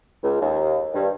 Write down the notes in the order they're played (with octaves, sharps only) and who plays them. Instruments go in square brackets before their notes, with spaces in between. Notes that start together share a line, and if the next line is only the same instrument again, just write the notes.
[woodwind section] C#2
D#2
G2